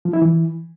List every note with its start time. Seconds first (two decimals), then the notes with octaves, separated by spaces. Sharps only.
0.05 F3
0.13 E4
0.22 E3